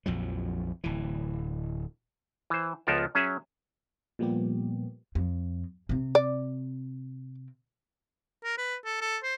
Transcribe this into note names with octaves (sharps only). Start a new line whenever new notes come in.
A#1 F2 F3 F#3
D1 E3
E3 C5
C#2 F3 B3 F4 A4 A#4
F#3 C#4 G#4 E5
A#2 F3 G3 A#3 B3 G4
F2
C3 C4
D5
A#4
B4
A4
A4
C5